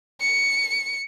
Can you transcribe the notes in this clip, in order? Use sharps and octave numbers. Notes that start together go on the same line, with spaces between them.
C#7